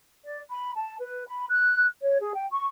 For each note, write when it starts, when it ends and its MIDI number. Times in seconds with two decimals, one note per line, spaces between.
0.23 0.40 74
0.50 0.71 83
0.74 0.96 81
1.00 1.24 71
1.28 1.45 83
1.49 1.85 90
2.02 2.17 73
2.21 2.32 68
2.34 2.46 79
2.51 2.65 85